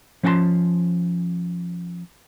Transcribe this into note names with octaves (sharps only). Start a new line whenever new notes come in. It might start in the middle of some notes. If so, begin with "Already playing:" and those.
F3 C#4 F#5 G5 A5 C6